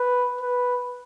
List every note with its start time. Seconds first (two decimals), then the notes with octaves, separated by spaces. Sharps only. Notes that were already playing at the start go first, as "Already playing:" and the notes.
Already playing: B4
0.41 B4